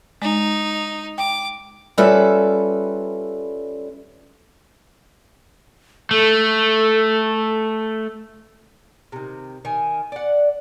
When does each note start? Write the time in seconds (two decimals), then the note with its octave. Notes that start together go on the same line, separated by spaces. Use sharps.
0.22 G#3 D#4
1.18 G5 D6
1.98 G3 C#4 F4 A4 B4 E5
6.11 A3 A4
9.12 C3 D#3
9.65 D#3 G#5
10.12 D5 F#5